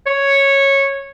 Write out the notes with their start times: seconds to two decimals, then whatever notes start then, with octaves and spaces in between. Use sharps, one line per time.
0.07 C#5